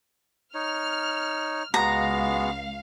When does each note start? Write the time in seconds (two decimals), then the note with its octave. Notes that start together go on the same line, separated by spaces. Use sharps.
0.55 D#4 C#5 F6
1.74 C#2 G#3 B3 F#4 F5 A#5